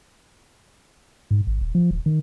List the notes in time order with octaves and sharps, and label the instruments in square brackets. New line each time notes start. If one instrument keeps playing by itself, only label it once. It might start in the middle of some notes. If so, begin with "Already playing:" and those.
[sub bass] G#2
G#1
D#1
F3
D#1
D#3